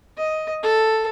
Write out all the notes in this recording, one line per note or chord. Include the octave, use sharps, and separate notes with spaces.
D#5
A4